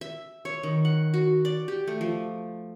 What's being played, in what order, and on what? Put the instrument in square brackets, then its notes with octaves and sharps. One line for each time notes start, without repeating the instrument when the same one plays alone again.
[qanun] E5
C#5
D#3
F#5
F#4
D5
G4
A3
F3